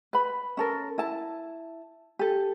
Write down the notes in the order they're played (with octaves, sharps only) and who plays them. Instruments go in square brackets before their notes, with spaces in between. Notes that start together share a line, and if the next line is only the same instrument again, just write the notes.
[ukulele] B4 B5
C#4 A4 A#4
E4 A5
G4 A4